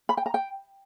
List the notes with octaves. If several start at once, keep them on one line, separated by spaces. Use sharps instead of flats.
B5
G5
A#5
G5